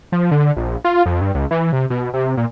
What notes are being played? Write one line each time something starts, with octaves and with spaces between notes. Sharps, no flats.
F3
D3
A#1
F4
F2
G2
C#2
E3
C3
B2
C3
A#2